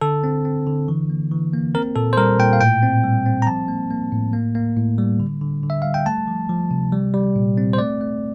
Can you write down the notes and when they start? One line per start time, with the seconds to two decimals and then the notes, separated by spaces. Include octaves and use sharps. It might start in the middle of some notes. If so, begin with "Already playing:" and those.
0.01 D3 A4
0.24 C4
0.45 C4
0.67 D3
0.88 E3
1.10 A#3
1.31 E3
1.53 A#3
1.75 C4 A#4
1.96 A#2 A4
2.13 C5
2.17 G3 A#4
2.39 A#2 G5
2.53 F5
2.61 A2 G5
2.83 C4
3.04 G3
3.26 C4
3.42 A#5
3.47 F3 A5
3.68 A#3
3.91 A#3
4.12 A2
4.33 A#3
4.55 A#3
4.77 A2
4.98 G3
5.20 D3
5.42 D3
5.63 D3
5.70 E5
5.82 G3 F5
5.94 G5
6.06 A3 A5
6.28 F3
6.49 F3
6.71 C3
6.92 G3
7.14 G3
7.36 A#2
7.57 C4
7.73 C5
7.78 A3 D5
8.01 A3